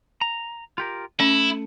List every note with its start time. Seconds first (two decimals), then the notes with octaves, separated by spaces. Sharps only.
0.21 A#5
0.78 F4 G4 A#4
1.20 A3 C#4 E4